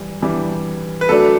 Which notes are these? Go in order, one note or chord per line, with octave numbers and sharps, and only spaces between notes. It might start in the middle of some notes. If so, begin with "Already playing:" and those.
Already playing: E3 G3
E3 G3 D4
B4
F#3 A3 D4 A4